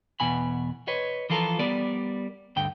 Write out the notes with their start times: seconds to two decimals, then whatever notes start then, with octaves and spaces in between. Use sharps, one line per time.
0.20 E2 B2 G#5 B5
0.88 B4 C#5 D#5
1.30 E3 F3 F4 A4 A#4
1.59 G3 B3 A#4 D5
2.56 D2 G2 G5